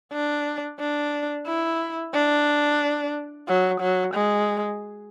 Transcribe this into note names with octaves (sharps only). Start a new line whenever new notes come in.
D4
D4
E4
D4
F#3
F#3
G#3